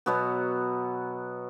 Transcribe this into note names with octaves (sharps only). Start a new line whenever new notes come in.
B2 F#3 B3 F#4